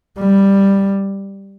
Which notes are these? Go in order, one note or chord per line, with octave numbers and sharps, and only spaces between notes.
G3